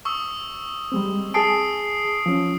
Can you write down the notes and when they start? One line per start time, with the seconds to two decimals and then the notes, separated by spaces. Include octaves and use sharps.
0.05 C#6 D#6 E6
0.92 G3 G#3 C4
1.34 G#4 G#5 A5 D#6 C7 D7
2.26 F3 C#4